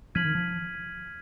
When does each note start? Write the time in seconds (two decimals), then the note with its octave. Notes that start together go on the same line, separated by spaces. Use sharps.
0.15 F3 F6 G#6 B6 D#7 F#7
0.25 D#3
0.35 F3